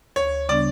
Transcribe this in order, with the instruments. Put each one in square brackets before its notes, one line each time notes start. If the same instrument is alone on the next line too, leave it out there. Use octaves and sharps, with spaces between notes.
[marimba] D2 [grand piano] C#5
[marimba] C#3 G3 B3 D4 [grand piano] D5